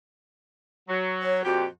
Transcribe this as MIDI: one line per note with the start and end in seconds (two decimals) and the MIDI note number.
0.89 1.41 54
1.22 1.45 73
1.45 1.65 41
1.45 1.65 46
1.45 1.65 66
1.45 1.65 67